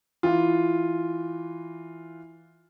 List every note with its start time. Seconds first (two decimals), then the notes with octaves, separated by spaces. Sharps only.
0.23 E3 F4